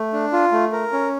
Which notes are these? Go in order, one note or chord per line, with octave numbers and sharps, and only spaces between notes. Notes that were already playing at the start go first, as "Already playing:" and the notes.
Already playing: A3
D4
F4
A3
A#4
C#4